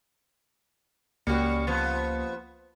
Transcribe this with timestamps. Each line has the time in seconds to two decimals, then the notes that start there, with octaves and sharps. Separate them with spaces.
1.27 C#2 G3 A#3 C#4 F#4 C#7
1.67 F3 B3